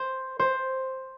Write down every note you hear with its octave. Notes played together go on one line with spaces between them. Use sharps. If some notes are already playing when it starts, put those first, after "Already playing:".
Already playing: C5
C5